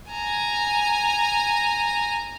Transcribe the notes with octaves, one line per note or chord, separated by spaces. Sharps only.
G#5 A#5